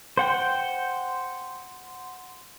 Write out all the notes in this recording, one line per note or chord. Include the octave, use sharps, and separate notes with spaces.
C5 F#5 G5